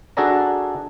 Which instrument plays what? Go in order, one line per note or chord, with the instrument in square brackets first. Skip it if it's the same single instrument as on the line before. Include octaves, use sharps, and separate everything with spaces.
[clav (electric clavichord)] D4 F#4 G#4 A4 D5 A#5